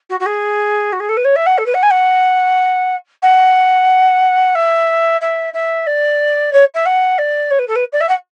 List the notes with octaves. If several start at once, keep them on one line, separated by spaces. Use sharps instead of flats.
F#4
F#4
G#4
F#4
G#4
A4
B4
C#5
E5
F#5
A4
B4
F#5
G#5
F#5
F#5
E5
E5
E5
D5
C#5
E5
F#5
D5
C#5
B4
A4
B4
D5
E5
F#5